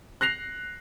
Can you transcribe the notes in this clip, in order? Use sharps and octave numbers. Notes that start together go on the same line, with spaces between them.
F#6 A#6 C7 F7